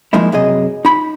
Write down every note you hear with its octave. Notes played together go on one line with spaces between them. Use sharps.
F3 G#3 A#3 D#4 E4
F#2 C3 G#4 D#5
D#4 B5